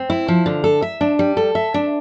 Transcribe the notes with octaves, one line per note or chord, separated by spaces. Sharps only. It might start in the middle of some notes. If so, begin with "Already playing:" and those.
Already playing: C4
E4
F3
D3
A4
E5
D4
G3
A4
E5
D4